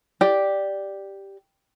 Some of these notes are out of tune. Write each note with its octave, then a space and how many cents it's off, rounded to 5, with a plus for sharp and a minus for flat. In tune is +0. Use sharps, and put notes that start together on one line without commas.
G4 +0 D5 +0